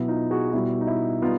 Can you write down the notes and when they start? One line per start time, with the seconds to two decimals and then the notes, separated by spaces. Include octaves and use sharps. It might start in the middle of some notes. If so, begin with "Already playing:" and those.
Already playing: B2 F#3 B3 E4
0.08 D#4 F4
0.31 F#4 G#4
0.53 B2 G3 B3 E4 F#4
0.81 D#4
0.87 E4
1.22 G3 B3 D#4 F4